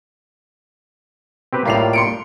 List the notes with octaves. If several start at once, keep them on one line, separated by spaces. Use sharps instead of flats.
C4 G4 B4
A2 G3 A#3 F4 C7 F7
C6 C#7 D7